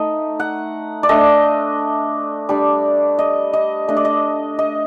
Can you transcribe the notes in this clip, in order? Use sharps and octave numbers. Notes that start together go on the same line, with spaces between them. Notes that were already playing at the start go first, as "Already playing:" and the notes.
Already playing: A3 D#4 D#5
F#5
D5
A3 D4 D#5
G3 D4
D#5
D#5
A3 D4 D#5
D5
D#5
D#5